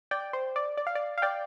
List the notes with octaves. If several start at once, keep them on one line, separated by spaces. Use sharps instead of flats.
D5 G5
C5
D5
D5
F5
D5
F5
D5 G5